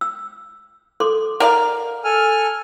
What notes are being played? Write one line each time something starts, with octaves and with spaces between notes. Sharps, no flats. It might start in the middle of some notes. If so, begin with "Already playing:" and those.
E6
A4 C6 D6
A#4 D5 F5 F#5
A4 G#5 F6